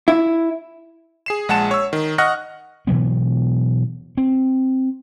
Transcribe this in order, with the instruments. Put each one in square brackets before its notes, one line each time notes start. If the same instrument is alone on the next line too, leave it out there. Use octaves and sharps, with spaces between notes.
[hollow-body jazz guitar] E4
[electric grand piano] G#4 C7 E7
A#1 G#3 F#5 A5 E7
C#5 E6
D#3
D#5 F#5 C#6 F6 F#6 A#6
[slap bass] B2 E3 F#3 B3
C4